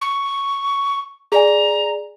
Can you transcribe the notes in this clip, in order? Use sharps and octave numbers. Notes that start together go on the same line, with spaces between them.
C#6
G#4 D5 G#5 A#5